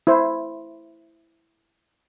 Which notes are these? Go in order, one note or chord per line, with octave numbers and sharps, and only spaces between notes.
E4 C5